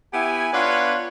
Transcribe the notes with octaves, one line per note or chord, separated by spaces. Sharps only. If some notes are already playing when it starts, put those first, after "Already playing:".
B3 E4 G4 G#5
B3 D4 F4 B4 C#5